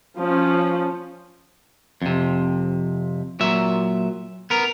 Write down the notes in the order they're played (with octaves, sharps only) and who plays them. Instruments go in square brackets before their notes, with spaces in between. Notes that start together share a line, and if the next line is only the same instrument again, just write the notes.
[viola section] F3 C#4
[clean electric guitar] F2 C3
A#2 F#3 E5
B3 A#4